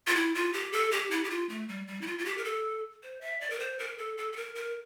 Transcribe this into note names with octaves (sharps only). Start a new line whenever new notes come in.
F4
E4
F4
G4
A4
G4
E4
G4
F4
A3
G3
G3
E4
F4
F4
G4
A#4
A4
C5
E5
D5
A#4
C5
A#4
A4
A4
A4
A#4
A#4